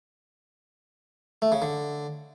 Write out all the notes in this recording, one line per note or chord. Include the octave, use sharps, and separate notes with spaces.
A3
C#3
D3